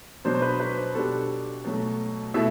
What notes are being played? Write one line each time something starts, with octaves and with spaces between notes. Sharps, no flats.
B2 F#3 B3 D4 C5
C5
B4
B4
C5
B2 G3 D4 A4
B2 F#3 A3
B2 A3 E4 E5